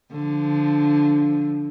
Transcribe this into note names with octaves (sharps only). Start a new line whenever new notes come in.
D3 F3